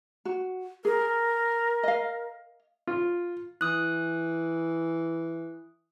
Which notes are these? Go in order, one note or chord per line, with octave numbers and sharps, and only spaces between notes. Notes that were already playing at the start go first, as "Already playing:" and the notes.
F#4
G#4 A#4
D#5 F5
F4
E3 D#6 F#6